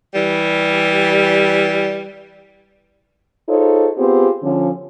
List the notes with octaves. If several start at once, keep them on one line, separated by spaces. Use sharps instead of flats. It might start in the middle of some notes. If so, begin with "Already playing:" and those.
E3 G3
D#4 F4 G#4 A4 C5 C#5
B3 C4 F4 G4 G#4 C5
D3 F3 C#4